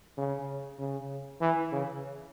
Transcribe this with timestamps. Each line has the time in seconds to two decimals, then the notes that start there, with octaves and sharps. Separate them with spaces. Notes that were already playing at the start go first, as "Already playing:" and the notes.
0.18 C#3
0.79 C#3
1.41 E3
1.72 C#3